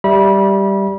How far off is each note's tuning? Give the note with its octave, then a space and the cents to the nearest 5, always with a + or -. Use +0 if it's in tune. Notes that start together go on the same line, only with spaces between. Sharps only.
G3 +0 E5 +0 B5 -30